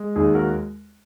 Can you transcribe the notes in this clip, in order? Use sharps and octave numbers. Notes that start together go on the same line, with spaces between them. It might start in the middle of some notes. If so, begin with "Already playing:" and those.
Already playing: G#3
D#2 D#4 G#4
F#4 A#4